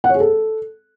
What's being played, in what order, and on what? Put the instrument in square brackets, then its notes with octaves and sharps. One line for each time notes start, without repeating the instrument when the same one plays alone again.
[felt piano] F#5
C#5
G#4
A4